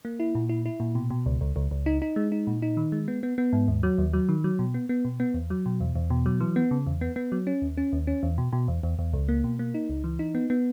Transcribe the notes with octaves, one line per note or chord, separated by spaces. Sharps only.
A#3
E4
A#2
E4
E4
A#2
B2
B2
C#2
C#2
C#2
C#2
D#4
D#4
G#3
D#4
A#2
D#4
D#3
G#3
B3
B3
B3
G#2
D#2
F#3
D#2
F#3
D#3
F#3
B2
B3
B3
B2
B3
E2
F#3
B2
E2
E2
B2
F#3
E3
B3
C#3
E2
B3
B3
F#3
C#4
D#2
C#4
D#2
C#4
E2
B2
B2
E2
E2
E2
C#2
A#3
B2
A#3
D#4
C#2
E3
D#4
B3
B3